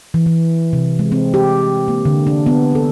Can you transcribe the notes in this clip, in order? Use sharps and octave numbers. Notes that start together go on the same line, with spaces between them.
E3
E3
C3
G#3
C4
G4
A#3
D3
D4
B3
A4